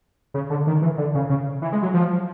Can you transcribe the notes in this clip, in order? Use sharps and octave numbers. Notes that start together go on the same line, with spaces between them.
C#3
D3
D#3
E3
D3
C#3
C#3
E3
G#3
F#3
F3